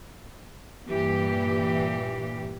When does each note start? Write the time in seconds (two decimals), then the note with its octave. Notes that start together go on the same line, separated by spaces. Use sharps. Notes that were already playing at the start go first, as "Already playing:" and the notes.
0.90 G2 A#2 E3 G4